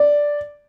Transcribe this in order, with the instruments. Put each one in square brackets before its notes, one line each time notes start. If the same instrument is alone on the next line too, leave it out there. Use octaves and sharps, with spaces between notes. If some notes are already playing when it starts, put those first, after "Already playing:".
Already playing: [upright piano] D5